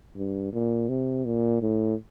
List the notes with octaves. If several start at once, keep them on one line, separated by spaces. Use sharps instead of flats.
G2
A#2
C3
A#2
A2